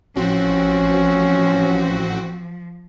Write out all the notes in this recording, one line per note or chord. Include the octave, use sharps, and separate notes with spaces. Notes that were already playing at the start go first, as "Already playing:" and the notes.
A1 F3 C4 C#4 F#4